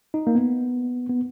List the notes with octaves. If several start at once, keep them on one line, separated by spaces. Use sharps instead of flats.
D#4
A#3
B3
B3